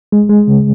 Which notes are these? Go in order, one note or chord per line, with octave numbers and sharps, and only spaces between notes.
G#3
G#3
C#3